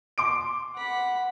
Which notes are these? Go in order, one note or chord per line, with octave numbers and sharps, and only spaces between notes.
C6 D6 D7
F#5 B5